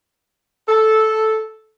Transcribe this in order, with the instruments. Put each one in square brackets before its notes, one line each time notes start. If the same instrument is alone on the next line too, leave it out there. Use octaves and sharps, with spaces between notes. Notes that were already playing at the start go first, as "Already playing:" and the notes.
[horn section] A4